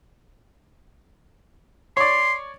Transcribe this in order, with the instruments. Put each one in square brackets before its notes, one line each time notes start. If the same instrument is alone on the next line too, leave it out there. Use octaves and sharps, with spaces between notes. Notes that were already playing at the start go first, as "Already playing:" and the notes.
[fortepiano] C#5 D5 [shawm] C6